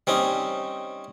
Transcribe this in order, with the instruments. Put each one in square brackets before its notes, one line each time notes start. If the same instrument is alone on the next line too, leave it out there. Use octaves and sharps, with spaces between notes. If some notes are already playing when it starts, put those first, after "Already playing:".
[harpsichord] G3 C4 C#4 D#4